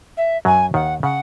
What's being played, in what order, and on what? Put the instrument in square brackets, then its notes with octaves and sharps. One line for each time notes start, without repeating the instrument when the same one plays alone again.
[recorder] E5
[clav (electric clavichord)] F#2 F#3 [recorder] G#5
[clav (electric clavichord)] D#2 D#3 [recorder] F#5
[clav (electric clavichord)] C#3 [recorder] F#5